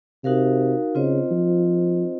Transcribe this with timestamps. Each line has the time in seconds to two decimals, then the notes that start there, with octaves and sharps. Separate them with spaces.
0.24 C3 D#4 F#4 A#4 F5
0.95 C#3 C4 F4 C5 D#5
1.31 F3